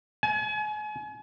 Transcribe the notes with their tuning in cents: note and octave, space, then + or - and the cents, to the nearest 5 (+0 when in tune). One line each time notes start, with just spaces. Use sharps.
G#5 +35